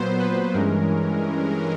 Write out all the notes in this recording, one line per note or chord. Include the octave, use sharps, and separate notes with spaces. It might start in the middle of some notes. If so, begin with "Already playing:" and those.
Already playing: A#2 F#3 B3 C5
B4
G2 E3 G#3 C#4 A#4